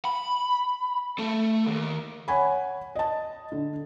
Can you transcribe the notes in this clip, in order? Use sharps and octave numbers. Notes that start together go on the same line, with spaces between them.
B5
A3 A4
D#2
C#5 F#5 G#5 B5
D#5 A5
D3